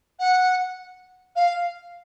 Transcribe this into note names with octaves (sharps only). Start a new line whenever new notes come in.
F#5
F5